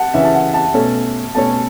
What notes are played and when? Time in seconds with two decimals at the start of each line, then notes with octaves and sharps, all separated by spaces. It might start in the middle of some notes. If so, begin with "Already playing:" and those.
Already playing: F#5 A5
0.14 C#3 E3 C#4 E5
0.24 A5
0.34 F#5
0.54 A5
0.74 B2 A3 C#4 A4 C#5
1.35 B2 A3 C#4 A4 C#5 A5